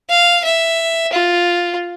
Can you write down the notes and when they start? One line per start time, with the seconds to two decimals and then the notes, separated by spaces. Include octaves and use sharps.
0.09 F5
0.44 E5
1.13 F4